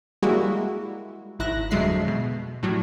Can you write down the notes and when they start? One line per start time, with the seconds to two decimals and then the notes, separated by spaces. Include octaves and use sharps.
0.22 G3 G#3 A#3 E4 F#4
1.39 G#1 E4 F#6 A#6
1.71 F2 D3 F#3 G#3 E5 C7
2.08 B2
2.63 A2 F#3 G3